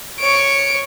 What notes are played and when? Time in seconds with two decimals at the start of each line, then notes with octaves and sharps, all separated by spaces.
0.20 C#5 C#6 D7